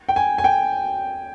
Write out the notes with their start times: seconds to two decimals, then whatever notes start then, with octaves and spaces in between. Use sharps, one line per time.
0.09 G5
0.16 G#5
0.38 G#5
0.44 G5